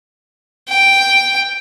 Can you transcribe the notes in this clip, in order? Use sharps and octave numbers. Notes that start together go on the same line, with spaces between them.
G5